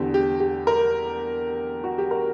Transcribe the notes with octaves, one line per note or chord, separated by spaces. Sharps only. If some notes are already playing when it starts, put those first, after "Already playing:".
Already playing: E2 D3 G4
G4
G4
A#4
F#4
G4
A#4